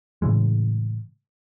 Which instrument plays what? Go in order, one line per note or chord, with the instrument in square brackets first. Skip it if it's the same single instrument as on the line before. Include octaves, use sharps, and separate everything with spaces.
[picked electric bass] A2 C#3 E3 G#3